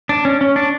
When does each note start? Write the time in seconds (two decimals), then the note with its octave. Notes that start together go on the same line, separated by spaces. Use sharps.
0.09 D4
0.25 C#4
0.41 C#4
0.56 D4